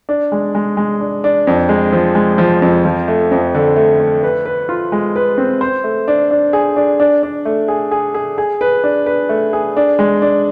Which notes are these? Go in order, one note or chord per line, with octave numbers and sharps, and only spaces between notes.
D4
G#3
G#3
G#3
D4
D4
F2
G#3
F3
G#3
F3
F2
F3
A3
F2
D3
A3
A3
B4
B4
F4
G#3
B4
C4
C5
A3
D4
D4
G#4
D4
D4
D4
A3
G#4
G#4
G#4
G#4
B4
D4
B4
A3
G#4
D4
G#3
D4